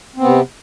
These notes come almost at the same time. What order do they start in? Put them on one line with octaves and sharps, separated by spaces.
C4 B3 C3